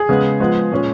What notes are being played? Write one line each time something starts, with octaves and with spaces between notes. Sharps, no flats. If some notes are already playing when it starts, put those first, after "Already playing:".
Already playing: G#4
C#3 G#3 B3
F3 G#3 B3
A#2 G#3 C#4